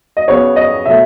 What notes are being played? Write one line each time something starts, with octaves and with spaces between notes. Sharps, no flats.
D#5
C#3 F#3 B3 C#5
D#5
B2 F#3 A3 E5